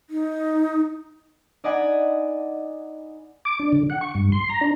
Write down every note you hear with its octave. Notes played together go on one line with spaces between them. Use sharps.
D#4
D#4 D5 D#5 F#5 G#5 B5
D6
D4
D3
F#5
C#6
G2
C6
A#5
D4